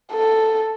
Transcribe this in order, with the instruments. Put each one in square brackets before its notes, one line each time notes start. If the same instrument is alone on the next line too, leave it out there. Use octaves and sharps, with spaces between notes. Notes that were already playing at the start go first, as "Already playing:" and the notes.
[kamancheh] A4